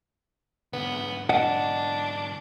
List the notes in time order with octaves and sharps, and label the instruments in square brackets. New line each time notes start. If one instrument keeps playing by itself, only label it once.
[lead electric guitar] G#2 D3 [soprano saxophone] B3
[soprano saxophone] D4 [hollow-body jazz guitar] D#5 F#5